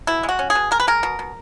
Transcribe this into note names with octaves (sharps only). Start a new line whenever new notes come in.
B2 E4
G#3
F#4
C#4
G#4
B2
G#3 A#4
B4
G#3 A#4
B2
B2